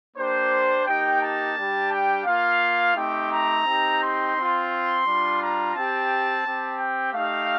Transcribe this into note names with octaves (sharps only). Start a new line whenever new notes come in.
A#3 D4 G4 C5
A#3 D#4 G4 G5
A5
G3 D4 G4
G5
A#3 F4 F5
A3 C4 D#4 G4 G5
A#5
C4 D#4 G4
C6
C4 F4
C6
G3 D4 F4
A#5
C4 G4 A5
C4 G4
G5
A3 D#4 G4 F5